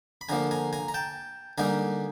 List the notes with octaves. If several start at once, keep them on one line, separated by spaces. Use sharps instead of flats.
B5
D3 F3 A#3 G#5 A#5
G#5 A#5
G#5 A#5
A#5
G5 A5
D3 G3 A#3 D#4 G#5 A#5